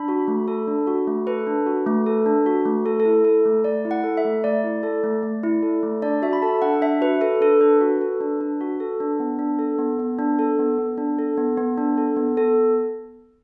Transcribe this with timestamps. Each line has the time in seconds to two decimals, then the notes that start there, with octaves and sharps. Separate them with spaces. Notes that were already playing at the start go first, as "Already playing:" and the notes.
Already playing: D4 B5
0.08 F#4
0.28 A3
0.48 A4
0.68 D4
0.87 F#4
1.07 A3
1.27 A4 B4
1.47 D4
1.66 F#4
1.87 A3
2.06 A4
2.26 D4
2.46 F#4
2.66 A3
2.85 A3 A4
3.00 A4
3.05 E4
3.25 A4
3.45 A3
3.64 A3 D5
3.85 E4
3.91 F#5
4.04 A4
4.17 E5
4.25 A3
4.44 A3 D5
4.64 E4
4.83 A4
5.04 A3
5.23 A3
5.43 E4
5.63 A4
5.83 A3
6.02 D4 D5
6.22 F#4 E5
6.33 B5
6.42 A4 A5
6.62 D4 F#5
6.81 D4 E5
7.01 F#4 B4
7.21 A4 B4
7.41 D4 A4
7.61 D4 B4
7.81 F#4
8.01 A4
8.21 D4
8.41 D4
8.61 F#4
8.80 A4
9.00 D4
9.20 B3
9.39 D4
9.59 A4
9.79 B3
9.99 B3
10.19 D4
10.39 A4
10.59 B3
10.78 B3
10.98 D4
11.18 A4
11.37 B3
11.58 B3
11.78 D4
11.97 A4
12.16 B3
12.37 B3 A4